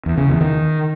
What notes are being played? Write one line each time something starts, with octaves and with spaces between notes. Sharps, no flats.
E2
C#3
E2
D#3